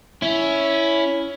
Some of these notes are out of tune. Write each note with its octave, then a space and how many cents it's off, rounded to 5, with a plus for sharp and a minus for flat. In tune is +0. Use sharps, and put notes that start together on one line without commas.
C#4 +10 E4 +0